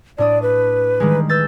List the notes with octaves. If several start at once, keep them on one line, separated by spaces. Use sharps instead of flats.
A2 D4 D5 D#6
B4
D#3 G3 G#3
B4 E6 G6 A6